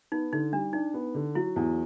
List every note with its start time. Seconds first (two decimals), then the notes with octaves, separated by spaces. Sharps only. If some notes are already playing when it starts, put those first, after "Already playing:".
0.12 B3 D#4
0.33 D3 D#4
0.53 G3 D4
0.73 D4 D#4
0.94 B3
1.15 D3
1.35 F#3 E4
1.56 E2